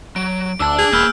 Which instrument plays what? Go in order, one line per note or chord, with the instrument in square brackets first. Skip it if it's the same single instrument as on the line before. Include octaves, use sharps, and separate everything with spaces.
[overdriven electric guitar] F#3 [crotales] D7
[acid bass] D2 [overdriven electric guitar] D4 A5 [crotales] E6
[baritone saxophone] G#4
[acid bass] E1 [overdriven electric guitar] A#3 B5 [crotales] E6 F6 G6